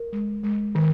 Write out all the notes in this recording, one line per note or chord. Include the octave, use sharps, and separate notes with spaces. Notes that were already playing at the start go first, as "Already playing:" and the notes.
Already playing: A#4
G#3
G#3
D#3